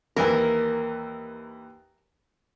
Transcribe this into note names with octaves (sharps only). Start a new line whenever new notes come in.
D#2 E3 A#3 A#4